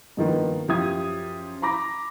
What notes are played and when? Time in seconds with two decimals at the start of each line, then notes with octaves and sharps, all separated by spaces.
0.17 G2 D#3 F3 A#3 B3
0.68 F#2 F3 G4 E5 D#6 G#6
1.62 A#5 B5 D6 A#6